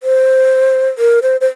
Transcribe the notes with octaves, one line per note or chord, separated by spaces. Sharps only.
C5
A#4
C5
C5